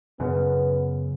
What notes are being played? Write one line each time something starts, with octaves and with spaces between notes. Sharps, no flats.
F#2 C#3 B3